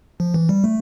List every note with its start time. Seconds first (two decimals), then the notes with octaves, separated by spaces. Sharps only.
0.20 F3
0.34 E3
0.49 G3
0.64 A3